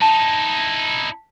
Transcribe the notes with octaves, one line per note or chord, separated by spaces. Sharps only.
D#4 E4 A5